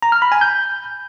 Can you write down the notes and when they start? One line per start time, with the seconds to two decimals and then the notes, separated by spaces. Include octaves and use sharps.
0.02 A#5
0.12 F6
0.22 B5
0.32 G#5
0.41 G6